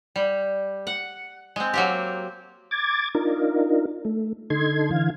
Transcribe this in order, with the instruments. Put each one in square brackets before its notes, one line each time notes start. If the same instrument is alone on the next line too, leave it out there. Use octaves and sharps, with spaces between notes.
[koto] G3
F#5
G#3 C4
F#3 A#3 G4
[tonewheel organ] D6 G#6 A6
D4 D#4 F4 A#4
A3
D3 D#4 A4 C6 G#6
D3 E3 F5 G#6